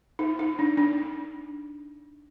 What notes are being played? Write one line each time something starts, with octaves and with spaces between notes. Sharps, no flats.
D#4
D#4
D4
D4